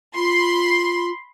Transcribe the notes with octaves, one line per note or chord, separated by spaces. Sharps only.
F4 B5 C6